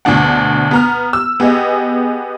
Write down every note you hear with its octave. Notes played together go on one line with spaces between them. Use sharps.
D2 B2 D4 F#5
B3 A#5 F6
E6
B3 G4 G#4 D#5